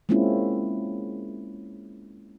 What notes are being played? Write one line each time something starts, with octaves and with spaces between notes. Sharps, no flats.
G#3 A#3 C4 C#4 E4 F4